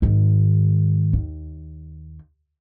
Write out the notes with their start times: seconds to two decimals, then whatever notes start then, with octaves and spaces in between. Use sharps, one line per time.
0.02 G#2 D#3
1.13 D#2